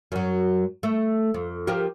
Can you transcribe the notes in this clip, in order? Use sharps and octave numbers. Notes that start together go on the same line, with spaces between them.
F#2 F#3
A3
F2
F3 G4 A#4